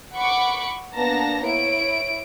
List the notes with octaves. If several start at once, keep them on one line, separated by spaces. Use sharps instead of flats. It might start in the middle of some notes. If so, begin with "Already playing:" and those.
F#5 B5 C#6 D6 C#7
A#3 B3 D4 A5 A#5 A#6
E4 C#5 D7